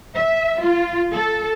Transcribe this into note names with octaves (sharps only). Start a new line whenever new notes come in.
E5
F4
A4